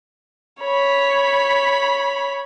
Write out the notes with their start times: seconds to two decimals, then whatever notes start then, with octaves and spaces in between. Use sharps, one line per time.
0.60 C#5 B5